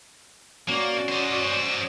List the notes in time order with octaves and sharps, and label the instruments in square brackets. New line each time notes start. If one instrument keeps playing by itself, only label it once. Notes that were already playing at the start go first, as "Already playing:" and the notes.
[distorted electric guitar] A#3 [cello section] C#4 F#4 D5
[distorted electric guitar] C5 D#5